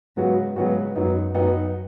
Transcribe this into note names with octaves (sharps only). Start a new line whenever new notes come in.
G#2 C#3 F#3 B3 F#4
G#2 C#3 F#3 B3 F#4
F#2 F#3 B3 D#4
F#2 F#3 B3 D#4